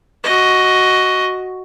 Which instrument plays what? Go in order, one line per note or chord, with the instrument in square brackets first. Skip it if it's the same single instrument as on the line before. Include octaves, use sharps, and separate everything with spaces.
[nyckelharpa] F#4 D#5